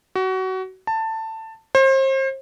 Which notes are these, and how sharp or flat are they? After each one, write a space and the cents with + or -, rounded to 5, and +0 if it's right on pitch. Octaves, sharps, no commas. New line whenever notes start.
F#4 +25
A5 +15
C5 +35